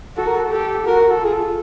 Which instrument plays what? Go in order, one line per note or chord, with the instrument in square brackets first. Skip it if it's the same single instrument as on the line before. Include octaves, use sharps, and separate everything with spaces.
[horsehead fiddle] F#4 [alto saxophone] A4
[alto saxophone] A#4
A4
[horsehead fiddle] G4 [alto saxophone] A4
[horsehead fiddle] F#4 [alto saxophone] A#4
[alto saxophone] A4
[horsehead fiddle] F4 [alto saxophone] G#4
[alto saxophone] A4